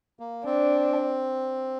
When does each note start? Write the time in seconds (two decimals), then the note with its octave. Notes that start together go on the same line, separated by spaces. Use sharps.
0.20 A#3
0.46 C4 D4